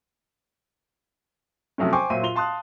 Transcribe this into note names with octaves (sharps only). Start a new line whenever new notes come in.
C3 F3 F#3 A3 C#4
C5 G5 G#5 C#6 D6
A#2 F#3 C5 E5 D#7
F4 F7 G7
F5 A5 C6 D#6 F#6